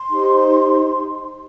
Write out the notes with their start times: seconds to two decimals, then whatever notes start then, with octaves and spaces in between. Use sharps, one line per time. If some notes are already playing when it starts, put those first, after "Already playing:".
Already playing: C6
0.09 D#4 G4 C5